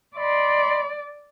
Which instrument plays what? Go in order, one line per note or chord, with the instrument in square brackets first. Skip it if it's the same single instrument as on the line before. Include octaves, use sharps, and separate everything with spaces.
[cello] D5 [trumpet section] D#5 B5 C6